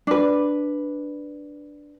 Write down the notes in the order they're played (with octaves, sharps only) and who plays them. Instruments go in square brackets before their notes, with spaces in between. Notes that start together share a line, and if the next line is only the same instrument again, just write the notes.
[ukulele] D4 B4